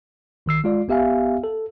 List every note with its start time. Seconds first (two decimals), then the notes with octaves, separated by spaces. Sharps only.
0.46 G#1 D#3 E6 C7
0.64 G#3 F4 D5
0.88 A1 B3 G4 E5 F5 G#5
1.44 A4